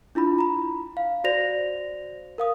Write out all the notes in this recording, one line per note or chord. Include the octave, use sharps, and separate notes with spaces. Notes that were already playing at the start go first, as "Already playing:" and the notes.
D4 E4 F4 B5
A#5 B5
F5
F#4 C5 D5 A#6 F7
A#4 F5 D#6